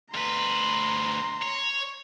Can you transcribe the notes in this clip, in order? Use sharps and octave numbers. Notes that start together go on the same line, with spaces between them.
D2 B4 A#5 C6
C#5